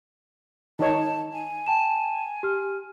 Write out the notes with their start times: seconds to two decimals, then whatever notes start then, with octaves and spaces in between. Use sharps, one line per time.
0.79 D#3 D#4 C#5 A5
1.32 G#5
1.67 G5 A5 E7
2.43 G4 F6